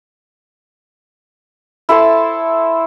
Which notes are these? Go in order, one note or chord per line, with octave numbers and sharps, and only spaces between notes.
E4 A4 C5 A5